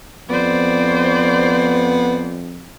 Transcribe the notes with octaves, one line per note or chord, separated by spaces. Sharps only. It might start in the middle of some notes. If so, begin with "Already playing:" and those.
F2 B3 C5 D5